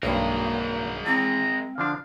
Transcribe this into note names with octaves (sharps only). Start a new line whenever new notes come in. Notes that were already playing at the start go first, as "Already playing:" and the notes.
B1 G2 G#3 A#3 A#4
E3 C4 A#5
D3 F3 D4 F5